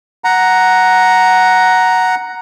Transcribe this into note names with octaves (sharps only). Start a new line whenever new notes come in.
F#5 A#5